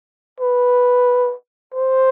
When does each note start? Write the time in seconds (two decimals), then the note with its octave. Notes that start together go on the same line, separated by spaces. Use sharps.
0.40 B4
1.74 C5